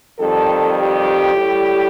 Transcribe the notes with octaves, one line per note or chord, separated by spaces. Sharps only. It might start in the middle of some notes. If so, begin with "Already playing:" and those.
F2 D#3 G3 A4
G4
A2 G3